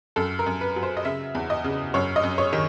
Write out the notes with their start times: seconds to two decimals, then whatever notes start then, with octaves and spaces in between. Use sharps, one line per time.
0.16 F#2 A4
0.39 A#4
0.46 F#2
0.61 B4
0.76 F#3
0.83 C5
0.97 D#5
1.05 C#3 E5
1.35 E2
1.50 D#5
1.64 C#3
1.94 F#2 C#5
2.16 D#5
2.23 F#2
2.38 C#5
2.53 D#3